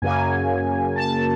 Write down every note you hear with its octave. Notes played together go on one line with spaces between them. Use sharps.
F#2 C#3 F#3 A#3 G#5
A5